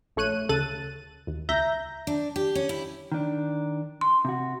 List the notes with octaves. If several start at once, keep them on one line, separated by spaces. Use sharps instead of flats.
A#1 A3 C#5 F#6 D#7
D2 C#3 A4 F#6 A6 D#7
D#2
C#2 E5 A#5 G6 A#6
D4
G4
C#4
E4
D#3 D4
C6
C3 F#4